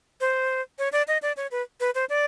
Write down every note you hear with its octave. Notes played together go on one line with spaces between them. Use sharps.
C5
C#5
D5
D#5
D5
C#5
B4
B4
C5
D5